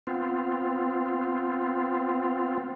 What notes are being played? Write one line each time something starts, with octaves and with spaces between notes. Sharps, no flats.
B3 C4 F4